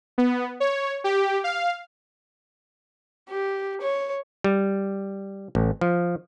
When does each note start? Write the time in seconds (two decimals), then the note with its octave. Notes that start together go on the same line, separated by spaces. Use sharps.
0.18 B3
0.60 C#5
1.04 G4
1.44 F5
3.29 G4
3.81 C#5
4.44 G3
5.55 A1
5.81 F3